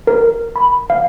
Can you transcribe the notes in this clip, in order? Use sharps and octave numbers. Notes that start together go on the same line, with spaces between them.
A#4
B5
F5